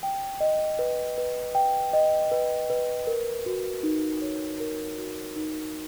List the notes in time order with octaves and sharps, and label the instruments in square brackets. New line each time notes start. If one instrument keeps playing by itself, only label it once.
[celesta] G5
D#5
B4
B4
G5
D#5
B4
B4
A#4
F#4
D#4
C#5
A#4
F#4
D#4